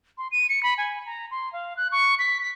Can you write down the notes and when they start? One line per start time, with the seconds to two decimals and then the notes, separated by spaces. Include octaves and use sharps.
0.18 C6
0.31 D#7
0.49 C#7
0.63 B5
0.78 G#5
1.06 A#5
1.31 C6
1.53 F5
1.77 F#6
1.92 C#6
2.19 B6
2.42 B6